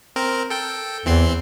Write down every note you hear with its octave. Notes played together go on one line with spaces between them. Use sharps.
C4 A#4
A4 G5
E2 E3 C4 C6